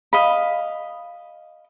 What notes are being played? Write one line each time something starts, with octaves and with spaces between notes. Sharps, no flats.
D#5 F5 B5